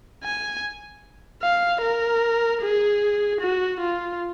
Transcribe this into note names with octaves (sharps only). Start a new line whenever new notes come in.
G#5
F5
A#4
G#4
F#4
F4